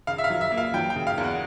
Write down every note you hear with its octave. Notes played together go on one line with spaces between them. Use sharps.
C#3 F5
E5
F5
F#3
E5
A#3
F5
F#3 G5
G5
C#3
F5
E2
F#5